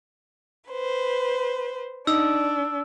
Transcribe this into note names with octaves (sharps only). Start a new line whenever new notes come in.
B4 C5
D4 D#4 E6